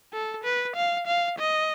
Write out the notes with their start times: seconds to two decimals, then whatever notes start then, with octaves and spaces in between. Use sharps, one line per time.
0.13 A4
0.44 B4
0.76 F5
1.07 F5
1.39 D#5